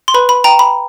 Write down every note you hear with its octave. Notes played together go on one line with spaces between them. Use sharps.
C6
B4 B5
B5
G5 A#5
B5